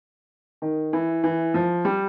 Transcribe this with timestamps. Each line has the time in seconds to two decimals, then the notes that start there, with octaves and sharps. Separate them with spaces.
0.62 D#3
0.93 E3
1.24 E3
1.54 F3
1.85 G3